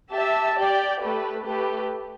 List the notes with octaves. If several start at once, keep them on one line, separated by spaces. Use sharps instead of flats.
G4 E5 A5
G4 D5 G5
A3 G4 B4
A3 G4 B4